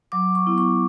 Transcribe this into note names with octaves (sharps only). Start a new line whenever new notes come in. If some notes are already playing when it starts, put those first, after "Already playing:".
F#3 D6
C#6
B3 E4
C#6